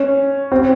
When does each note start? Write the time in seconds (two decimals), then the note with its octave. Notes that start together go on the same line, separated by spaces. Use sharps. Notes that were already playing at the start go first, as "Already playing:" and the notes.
Already playing: C#4
0.52 C4